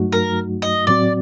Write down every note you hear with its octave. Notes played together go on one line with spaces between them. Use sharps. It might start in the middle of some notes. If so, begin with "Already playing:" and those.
Already playing: G2 F#3 A3 D#4 F#4
A#4
D#5
A2 F#3 C4 F#4 D5